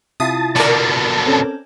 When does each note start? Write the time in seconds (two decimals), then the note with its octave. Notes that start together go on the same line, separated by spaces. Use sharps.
0.20 C3 E4 F4 A5 D#6
0.56 B2 D3 A#4 D5
1.26 C4 C#4 A4